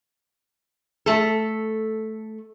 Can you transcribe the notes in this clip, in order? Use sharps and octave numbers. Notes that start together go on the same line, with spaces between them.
A3 A4